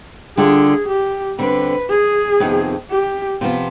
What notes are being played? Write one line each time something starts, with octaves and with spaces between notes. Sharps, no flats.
D3 G3 D4 F4 G#4
G4
D3 G3 C4 B4
G#4
F2 C3 D#3 B3 D#4
G4
C3 F3 B3 F4